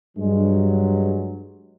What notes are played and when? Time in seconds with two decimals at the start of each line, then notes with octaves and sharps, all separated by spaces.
0.17 G2 F#3 G#3